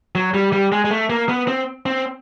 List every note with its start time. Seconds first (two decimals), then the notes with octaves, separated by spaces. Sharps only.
0.15 F#3
0.34 G3
0.53 G3
0.72 G#3
0.85 G#3
0.91 A3
1.10 A#3
1.29 B3
1.48 C4
1.86 C4